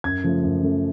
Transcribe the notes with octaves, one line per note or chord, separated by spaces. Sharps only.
F#2 G#6
C#3 F3 A3
F#2
C#3 F3 A3